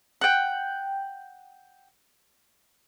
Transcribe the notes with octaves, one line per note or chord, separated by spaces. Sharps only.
F#5 G5